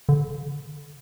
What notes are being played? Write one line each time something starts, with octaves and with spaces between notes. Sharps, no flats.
D3